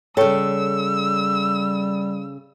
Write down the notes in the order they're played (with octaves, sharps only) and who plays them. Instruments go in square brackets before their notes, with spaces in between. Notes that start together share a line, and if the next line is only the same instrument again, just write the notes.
[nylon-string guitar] C#3 A4 [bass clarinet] G3 [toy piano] C#5 G5 C#6 [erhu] E6